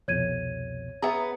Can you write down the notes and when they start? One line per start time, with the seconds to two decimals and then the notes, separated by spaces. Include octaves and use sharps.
0.08 C2 F2 B2 C#5 G#6 D#7
1.02 B3 G#4 E5 A#5